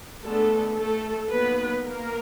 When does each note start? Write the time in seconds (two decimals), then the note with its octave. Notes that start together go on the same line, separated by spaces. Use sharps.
0.25 G#3 A3 B3 D4 A4
0.78 A3 A4
1.32 F#3 A#3 B3 D#4 B4
1.85 A#3 A#4